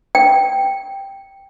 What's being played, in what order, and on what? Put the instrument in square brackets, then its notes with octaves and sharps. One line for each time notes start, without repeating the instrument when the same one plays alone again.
[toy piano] G5